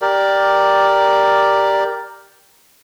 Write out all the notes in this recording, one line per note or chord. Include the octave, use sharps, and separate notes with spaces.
G4 A#4 D5